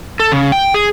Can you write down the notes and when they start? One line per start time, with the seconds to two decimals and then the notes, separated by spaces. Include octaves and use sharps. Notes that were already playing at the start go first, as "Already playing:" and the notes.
0.20 A4
0.31 C#3
0.52 G5
0.74 G#4